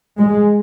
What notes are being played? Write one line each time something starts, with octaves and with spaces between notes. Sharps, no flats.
G#3